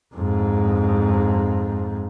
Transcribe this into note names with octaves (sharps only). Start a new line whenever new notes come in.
F2 G#2